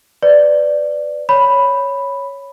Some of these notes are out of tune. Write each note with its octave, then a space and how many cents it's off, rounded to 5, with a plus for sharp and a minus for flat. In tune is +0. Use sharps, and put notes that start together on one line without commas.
B4 +25 D5 +0
C#5 +0 B5 +0